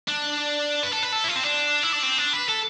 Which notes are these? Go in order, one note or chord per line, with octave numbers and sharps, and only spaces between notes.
D4
B4
A4
B4
A4
E4
F4
C4
D4
E4
D4
C4
D4
B4
A4